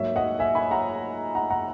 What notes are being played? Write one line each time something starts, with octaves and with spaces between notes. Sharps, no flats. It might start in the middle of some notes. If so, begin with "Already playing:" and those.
Already playing: G#2 F#3 A#3 C#5 E5
D#5 F#5
E5 G#5
G#5 B5
F#5 A#5
F#5 A#5
F#5 A#5